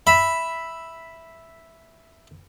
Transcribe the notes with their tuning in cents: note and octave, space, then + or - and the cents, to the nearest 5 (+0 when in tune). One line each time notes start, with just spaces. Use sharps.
E5 +0 B5 +0